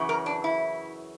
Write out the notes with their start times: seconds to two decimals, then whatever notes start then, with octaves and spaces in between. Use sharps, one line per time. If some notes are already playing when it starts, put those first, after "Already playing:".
Already playing: F#2 C#3 E3
0.09 A#4
0.26 D4
0.44 E4